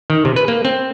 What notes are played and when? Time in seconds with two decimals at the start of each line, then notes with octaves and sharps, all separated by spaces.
0.10 D#3
0.25 C3
0.36 B4
0.48 A#3
0.65 C4